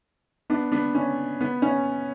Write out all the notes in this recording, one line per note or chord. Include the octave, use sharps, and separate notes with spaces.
B3 D4
B3 D4
C#4
B3
C#4